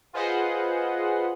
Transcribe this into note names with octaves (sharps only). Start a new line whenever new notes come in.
F4 G#4 B4 C5 D#5 F#5